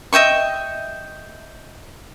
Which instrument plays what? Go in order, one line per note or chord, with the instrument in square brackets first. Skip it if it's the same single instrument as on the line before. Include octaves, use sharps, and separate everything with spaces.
[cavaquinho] D#5 E5 G5 C#6